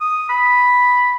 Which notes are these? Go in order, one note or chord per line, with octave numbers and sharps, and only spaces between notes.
D#6
B5